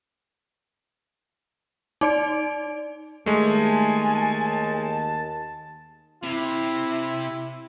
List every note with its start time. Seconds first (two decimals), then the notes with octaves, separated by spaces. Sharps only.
2.01 D#4 D5 D7
3.26 D#2 G#3 A3 G#5 A5
6.23 C3 E4